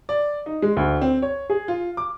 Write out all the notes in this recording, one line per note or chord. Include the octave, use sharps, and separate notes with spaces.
D5
D#4
G#3
D2
C4
C#5
G#4
F4
D6